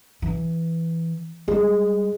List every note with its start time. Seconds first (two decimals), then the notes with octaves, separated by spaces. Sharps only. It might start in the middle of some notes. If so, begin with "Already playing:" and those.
0.22 E3
1.48 G3 G#3